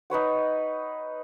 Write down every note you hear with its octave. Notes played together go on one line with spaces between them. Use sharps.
D#4 B4 C#5 F#5